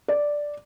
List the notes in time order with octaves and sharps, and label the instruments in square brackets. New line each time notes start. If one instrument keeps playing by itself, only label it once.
[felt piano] D5